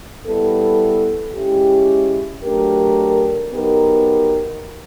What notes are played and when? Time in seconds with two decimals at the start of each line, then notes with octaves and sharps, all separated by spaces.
0.25 G3 B3 E4 A4
1.35 G#3 C#4 E4 G4
2.43 F#3 A3 D4 G4 A#4
3.53 F#3 B3 D#4 G4 A#4